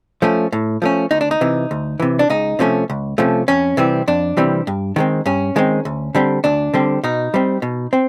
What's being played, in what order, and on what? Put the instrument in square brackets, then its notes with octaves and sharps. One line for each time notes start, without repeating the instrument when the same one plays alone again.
[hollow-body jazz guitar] F3 A3 C#4
A2
F3 A3 C#4
D2 D#4
D4
D#4
C3 E3
D2
C3 E3
D4
C#2 D#4
C3 F3 A3 C#4
C#2
C3 F3 A3 C#4
F2 C#4
C3 E3 G3 C4
F2 D4
C3 E3 G3 C4
G2
D#3 G#3 C4
G2 C#4
D#3 G#3 C4
D2
D3 G3 C4
D2 D4
D3 G3 C4
B2 D#4
G3 C4
B2
C4